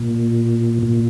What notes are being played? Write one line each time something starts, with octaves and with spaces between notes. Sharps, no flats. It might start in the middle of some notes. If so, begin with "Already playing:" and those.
Already playing: A#2
A#2